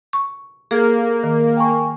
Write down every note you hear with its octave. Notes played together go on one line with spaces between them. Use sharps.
C#6
A#3 G#4 A4 F6
D#3
G5 G#5 C#6